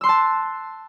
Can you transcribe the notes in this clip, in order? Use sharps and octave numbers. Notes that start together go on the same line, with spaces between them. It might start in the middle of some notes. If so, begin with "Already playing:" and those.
A5 C6 E6 F#6